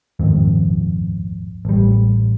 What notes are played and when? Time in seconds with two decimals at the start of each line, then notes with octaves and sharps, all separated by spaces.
0.19 D#1 G#1 F2 G#2
1.65 A1 G3